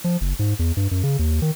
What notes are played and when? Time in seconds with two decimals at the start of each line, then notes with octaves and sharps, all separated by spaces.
0.04 F3
0.21 F#1
0.39 G#2
0.59 E2
0.77 G2
0.91 F#2
1.03 C#3
1.19 D#2
1.42 D#3